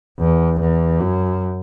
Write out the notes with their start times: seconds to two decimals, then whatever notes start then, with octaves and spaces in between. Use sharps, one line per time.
0.19 E2
0.60 E2
1.00 F#2